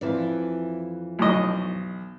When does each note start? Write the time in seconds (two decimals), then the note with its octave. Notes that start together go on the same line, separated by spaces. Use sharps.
0.01 F2 E3 D5
1.19 B1 D#5